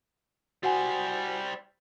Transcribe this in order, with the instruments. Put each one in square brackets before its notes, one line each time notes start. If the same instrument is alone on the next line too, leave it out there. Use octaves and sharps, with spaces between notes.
[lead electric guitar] G3 C5 [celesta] F#4 F#5 G#5